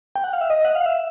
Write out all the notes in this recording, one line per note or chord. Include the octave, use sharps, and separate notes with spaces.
G5
F#5
F5
E5
D#5
F#5
F5
E5